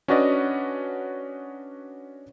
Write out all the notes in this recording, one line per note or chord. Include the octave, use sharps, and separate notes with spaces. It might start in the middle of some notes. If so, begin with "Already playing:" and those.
C#4 D4 F#4 B4 D5 D#5